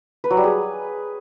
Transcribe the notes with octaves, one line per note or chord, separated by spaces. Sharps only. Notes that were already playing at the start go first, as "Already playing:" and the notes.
B4
F#3
G3
G#4